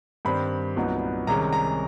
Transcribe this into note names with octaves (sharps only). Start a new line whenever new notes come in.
G2 D#3 G3 C4 B5
C2 A#2 F#3 B3 D#4
C2 C3 D#3 G#3 C#4 A#5
A#5